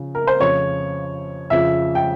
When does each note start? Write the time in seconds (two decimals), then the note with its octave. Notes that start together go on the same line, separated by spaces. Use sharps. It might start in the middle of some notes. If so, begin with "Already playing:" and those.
Already playing: C#3 F3
0.15 A#4
0.27 C5
0.40 F2 C#3 F3 C#5
1.50 F2 C#3 F3 E5
1.95 G5